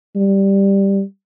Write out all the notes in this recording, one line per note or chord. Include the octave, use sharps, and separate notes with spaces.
G3